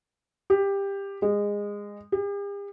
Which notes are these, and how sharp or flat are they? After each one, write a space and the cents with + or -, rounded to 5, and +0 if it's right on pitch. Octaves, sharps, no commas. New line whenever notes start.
G4 +15
G#3 -20
G4 +45